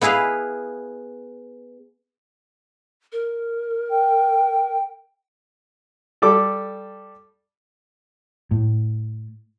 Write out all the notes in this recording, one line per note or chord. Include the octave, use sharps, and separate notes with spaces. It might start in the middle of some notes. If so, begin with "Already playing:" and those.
B3 E4 G#4 B4 F5
A#4
G5
G3 A4 D6
A2